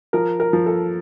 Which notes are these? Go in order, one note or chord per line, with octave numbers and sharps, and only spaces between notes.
F3 A#4
A#4
F3
A4